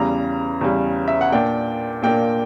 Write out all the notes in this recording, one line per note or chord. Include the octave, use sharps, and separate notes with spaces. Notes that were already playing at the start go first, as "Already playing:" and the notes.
Already playing: E2 C#3 G3 A#5
E2 C#3 G3
E5
F#5
A#2 A#3 D4 G5
A#2 A#3 D4 G5